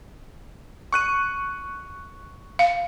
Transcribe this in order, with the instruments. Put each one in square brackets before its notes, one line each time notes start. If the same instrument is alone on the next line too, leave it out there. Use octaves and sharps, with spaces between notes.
[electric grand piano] C#6 F#6 D#7
[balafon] F5